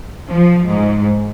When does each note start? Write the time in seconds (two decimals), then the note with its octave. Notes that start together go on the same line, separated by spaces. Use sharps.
0.28 F3
0.67 G#2